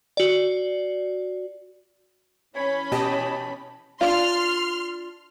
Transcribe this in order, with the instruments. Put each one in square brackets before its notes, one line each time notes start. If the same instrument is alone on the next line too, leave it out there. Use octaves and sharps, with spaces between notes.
[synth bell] F#4 D5
[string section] E3 C#4 B5 [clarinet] C#5
[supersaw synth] B2 G4 D#5 [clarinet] A5
[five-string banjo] D4 F4 [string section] C6 F6